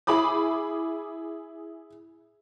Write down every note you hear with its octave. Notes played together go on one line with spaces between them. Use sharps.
E4 G#4 B5 D6 D#6